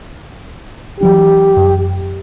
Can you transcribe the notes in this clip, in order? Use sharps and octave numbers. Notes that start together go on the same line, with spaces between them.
E3 F#3 D4 G4
F#2